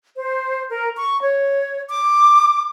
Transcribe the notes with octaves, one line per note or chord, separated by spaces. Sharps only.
C5
A#4
C#6
C#5
D6